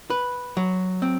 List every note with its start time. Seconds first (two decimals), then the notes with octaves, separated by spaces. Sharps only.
0.10 B4
0.57 F#3
1.02 C4